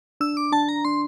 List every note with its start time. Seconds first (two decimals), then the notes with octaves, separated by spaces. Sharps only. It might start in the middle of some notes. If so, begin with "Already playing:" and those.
0.21 D4 E6
0.37 D6
0.52 D4 A5
0.69 A#5
0.85 D4 C6